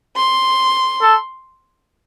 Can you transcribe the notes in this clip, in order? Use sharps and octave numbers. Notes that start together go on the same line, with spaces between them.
C6
A4